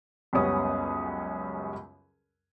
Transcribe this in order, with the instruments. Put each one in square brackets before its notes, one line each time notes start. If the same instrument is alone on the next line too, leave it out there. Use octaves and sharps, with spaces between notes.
[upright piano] C#2 F#2 G3 B3 C#4 D#6